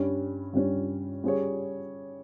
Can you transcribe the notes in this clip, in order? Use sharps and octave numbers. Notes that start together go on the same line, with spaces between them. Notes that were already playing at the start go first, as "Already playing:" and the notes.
Already playing: G2 G3 C#4
G2 G3 C#4
G3 C#4 G#4 C#5